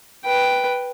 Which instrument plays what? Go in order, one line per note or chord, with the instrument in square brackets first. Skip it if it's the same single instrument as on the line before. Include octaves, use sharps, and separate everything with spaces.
[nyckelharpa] B4 G5